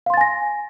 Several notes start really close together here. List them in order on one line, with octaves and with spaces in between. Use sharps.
F5 C6 A6 G#5 A#6